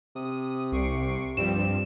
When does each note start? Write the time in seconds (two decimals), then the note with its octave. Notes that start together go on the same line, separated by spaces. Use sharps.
0.16 C3 D#6
0.72 C2 C#6 C7 D7
1.37 G2 F3 G3 C4 E7